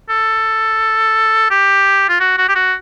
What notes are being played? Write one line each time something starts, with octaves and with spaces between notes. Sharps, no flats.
A4
G4
F4
F#4
F#4
G4
F#4